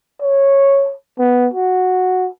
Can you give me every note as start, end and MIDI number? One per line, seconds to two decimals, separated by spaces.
0.22 0.94 73
1.19 1.48 59
1.54 2.29 66